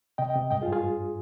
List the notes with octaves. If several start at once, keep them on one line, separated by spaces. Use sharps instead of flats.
C3 D#5 G5
D#5 G5
C3
G2 D#5 G5
F4 G#4
G2
F4 G#4
G2